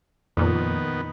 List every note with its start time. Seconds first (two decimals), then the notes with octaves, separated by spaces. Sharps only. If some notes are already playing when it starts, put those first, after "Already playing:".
0.37 F2 A#2 D#3 B3